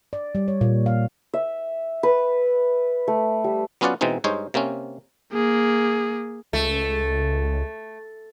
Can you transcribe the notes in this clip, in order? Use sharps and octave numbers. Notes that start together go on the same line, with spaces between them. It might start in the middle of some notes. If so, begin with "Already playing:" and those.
D5
G3
C#5
A#2
F5
E5
B4
A3
G3
F#3 B3 C#4 F4 D5 F#5
B2 E3 G#3 C4 D#4
G2 G#3 D#4 C5 C#5
C3 A#3 C4 C#4
A#3 G#4
C#2 A3